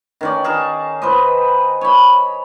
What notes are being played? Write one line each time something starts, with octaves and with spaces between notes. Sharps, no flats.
D#3 C#4 D5
G#4 A#4 A5
B4 C5 D#5
C#5 B5